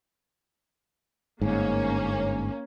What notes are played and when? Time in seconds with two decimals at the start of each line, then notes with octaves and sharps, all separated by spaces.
1.41 G1 G#2 A#3 C#4